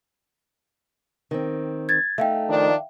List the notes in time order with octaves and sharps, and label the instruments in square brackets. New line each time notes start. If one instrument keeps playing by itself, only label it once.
[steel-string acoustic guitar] D#3 C4
[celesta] G#6 A6
[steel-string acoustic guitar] A3 D#4 [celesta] E5 F5 G5
[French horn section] D#3 F3 D4